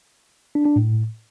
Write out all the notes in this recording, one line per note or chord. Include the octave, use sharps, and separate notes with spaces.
D4
D4
A2